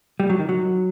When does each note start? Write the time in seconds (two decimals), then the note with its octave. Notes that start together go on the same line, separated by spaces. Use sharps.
0.20 G3
0.30 F#3
0.39 D#3
0.49 F#3